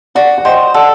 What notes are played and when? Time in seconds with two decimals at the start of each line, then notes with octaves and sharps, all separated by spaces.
0.15 F#4 D5 F#5
0.38 F#5
0.45 C5 D#5 G5
0.75 A4 D5 F#5